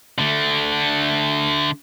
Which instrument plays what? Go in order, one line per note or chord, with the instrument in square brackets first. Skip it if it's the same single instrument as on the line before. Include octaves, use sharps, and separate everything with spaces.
[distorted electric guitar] D3 A3